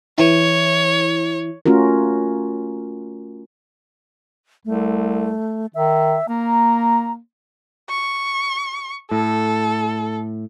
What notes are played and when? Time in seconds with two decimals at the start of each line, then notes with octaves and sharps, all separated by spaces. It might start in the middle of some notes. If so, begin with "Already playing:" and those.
0.18 E3 E4 C#5
1.66 A3 C#4 F4 F#4 A#4
4.65 C2 A3
5.74 D#3 E5
6.29 A#3 A#5
7.90 C#6
9.11 A2 A4